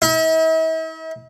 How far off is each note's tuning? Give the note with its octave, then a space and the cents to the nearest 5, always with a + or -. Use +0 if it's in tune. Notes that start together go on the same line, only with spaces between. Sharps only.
E4 -45